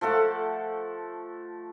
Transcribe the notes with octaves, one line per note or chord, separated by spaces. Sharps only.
F3 A3 A4 F#5